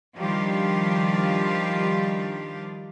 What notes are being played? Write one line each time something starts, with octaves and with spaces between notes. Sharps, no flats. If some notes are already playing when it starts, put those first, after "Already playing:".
D#3 F3 G3 D4 F4 G4